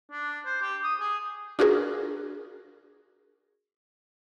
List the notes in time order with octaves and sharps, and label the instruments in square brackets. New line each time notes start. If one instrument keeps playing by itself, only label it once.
[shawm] D4
C5
G4
D#6
G#4
[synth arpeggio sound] D4 F4 F#4 G#4 A#4